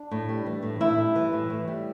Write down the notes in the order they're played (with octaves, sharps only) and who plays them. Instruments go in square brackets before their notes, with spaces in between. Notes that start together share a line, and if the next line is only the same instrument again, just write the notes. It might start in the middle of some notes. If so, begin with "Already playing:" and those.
Already playing: [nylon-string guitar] D4
A2
G3
E3
A2
A2 E4
G3
E3
A2
A2
G3